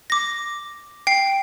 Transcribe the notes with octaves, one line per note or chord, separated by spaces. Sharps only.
D6 A#6
G5 C7